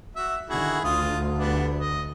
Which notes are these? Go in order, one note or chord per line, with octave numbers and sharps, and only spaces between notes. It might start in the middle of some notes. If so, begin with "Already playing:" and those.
F#4 E5
D3 D#3 E4 F#4 G#4
D2 F4 D#6
G3 B3 D4
D#5